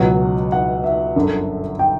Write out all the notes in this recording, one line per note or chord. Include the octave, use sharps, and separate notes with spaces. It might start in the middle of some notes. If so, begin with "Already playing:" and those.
Already playing: C#2 B2 F#3 F#5
F#5
E5
G1 F#2 D3
G5